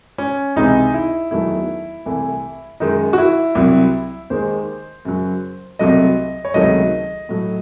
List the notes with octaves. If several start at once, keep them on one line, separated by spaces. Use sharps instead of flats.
C#4
C#2 C3 E3 D#4
E4
E2 D#3 F#3 A3 E4
C2 C3 E3 A3
F#2 D#3 G#3 D#4
F#4
E4
C2 C3 F#3
D#2 D#3 G#3 C5
F#2 C#3 F#3
C2 C3 F#3 A3 D#5
C#5
C#2 C3 D#3 F#3 A3 D#5
A2 F#3 A3